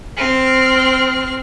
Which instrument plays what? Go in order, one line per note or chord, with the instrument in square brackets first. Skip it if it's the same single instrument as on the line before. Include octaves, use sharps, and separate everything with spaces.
[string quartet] C4 F6